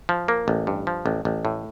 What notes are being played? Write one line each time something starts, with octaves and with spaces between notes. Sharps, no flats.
F3
A#3
A1
G2
F3
A1
A1
A2